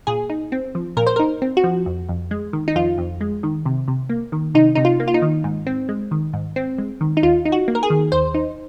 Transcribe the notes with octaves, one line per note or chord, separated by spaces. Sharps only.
A#2 G#4
D#4
C4
F3
A#2 A#4
C5
D#4 A#4
C4
F#4
F3
F2
F2
G#3
D#3
D#4
F2 F4
F2
G#3
D#3
C3
C3
A#3
D#3
C3 D#4
C3 D#4
F4
A#3
F4
D#4
D#3
G#2
C4
G#3
D#3
G#2
C4
G#3
D#3
D#4
D#2 F4
D#4
F#4
A#3
A#4
G#4
D#3
D#2 C5
D#4